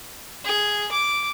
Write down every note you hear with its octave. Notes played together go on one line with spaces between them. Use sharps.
G#4
D6